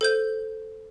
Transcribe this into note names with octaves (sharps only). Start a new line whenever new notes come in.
A4 C5 G6